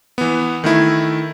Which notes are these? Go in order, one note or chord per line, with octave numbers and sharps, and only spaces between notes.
E3 B3
D#3 A3 E4